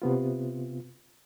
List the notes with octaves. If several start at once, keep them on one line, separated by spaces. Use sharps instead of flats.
C3 B3 F4